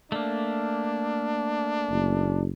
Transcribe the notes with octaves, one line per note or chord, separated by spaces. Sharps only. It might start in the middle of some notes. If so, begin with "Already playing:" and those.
A3 A#3 D4
F#1